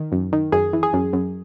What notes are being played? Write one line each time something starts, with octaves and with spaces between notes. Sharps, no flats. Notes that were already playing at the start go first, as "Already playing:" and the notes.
Already playing: D#3
F#2
D#3
F#2 G#4
E3
G#4
F#2
F#2